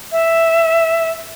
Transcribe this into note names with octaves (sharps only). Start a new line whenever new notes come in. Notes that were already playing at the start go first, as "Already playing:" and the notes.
E5